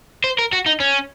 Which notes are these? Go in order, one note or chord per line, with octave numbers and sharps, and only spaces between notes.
C5
A#4
F#4
D#4
C#4